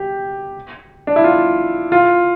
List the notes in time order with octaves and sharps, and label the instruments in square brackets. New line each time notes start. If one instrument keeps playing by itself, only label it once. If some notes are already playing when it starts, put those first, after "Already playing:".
Already playing: [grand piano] G4
D4
E4
F4
F4